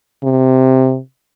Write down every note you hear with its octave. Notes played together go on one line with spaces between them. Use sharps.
C3